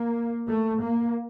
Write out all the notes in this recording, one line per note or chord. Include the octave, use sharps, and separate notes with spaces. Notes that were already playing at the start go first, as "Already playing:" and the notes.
Already playing: A#3
A3
A#3